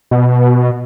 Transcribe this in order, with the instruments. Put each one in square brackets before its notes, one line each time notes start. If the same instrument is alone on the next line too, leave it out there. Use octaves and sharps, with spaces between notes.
[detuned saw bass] B2